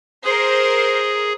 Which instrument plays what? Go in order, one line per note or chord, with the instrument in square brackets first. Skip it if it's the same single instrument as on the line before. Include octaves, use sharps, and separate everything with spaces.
[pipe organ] G#4 [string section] A#4 C5